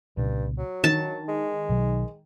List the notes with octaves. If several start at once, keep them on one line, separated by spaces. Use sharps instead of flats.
C2 G2 A#2 C#3
F#3
D#3 D4 A5
G#3
B1 B2 F#3